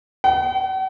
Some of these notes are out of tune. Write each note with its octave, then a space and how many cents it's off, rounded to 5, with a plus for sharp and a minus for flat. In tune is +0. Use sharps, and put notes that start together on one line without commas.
F#5 +45